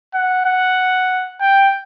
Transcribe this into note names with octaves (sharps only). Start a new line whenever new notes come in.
F#5
F#5
G5